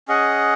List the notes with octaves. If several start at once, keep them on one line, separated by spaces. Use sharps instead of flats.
C#4 G#4 D#5 F#5